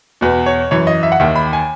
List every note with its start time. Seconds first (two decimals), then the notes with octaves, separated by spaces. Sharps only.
0.21 E2 B2 B4
0.46 C#5
0.71 F#2 E3 C#5
0.87 D#5
1.03 E5
1.12 F#5
1.20 D#2 D#3 E5
1.36 B5
1.53 G#5